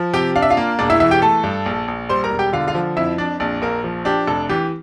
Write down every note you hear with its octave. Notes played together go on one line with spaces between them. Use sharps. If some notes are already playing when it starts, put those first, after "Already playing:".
Already playing: F3
C3 G4 G5
D4 F5
E5
F4 F5
A#3
E1 D4 D5
E4 E5
E3 E4 E5
G4 G5
A3 A4 A5
G2
A#1
A#1
G3 C5 C6
A#4 A#5
E1
G4 G5
D3 F4 F5
F4 F5
F3
F2 E4 E5
F2 D4 D5
A#1 D4 D5
A#1 A#3 A#4
F3
D4 G4
F1 A4
E3 G4